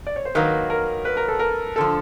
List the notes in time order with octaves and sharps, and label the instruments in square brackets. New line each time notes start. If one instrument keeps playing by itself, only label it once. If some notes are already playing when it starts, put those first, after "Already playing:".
[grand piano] D5
C#5
C5
[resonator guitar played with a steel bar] D#3 F#3 A#3 [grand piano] B4
[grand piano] A#4
B4
A#4
A4
A#4
[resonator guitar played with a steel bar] D3 F3 [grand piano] A4